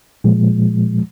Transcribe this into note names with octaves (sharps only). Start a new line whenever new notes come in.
A#2 F3 G#3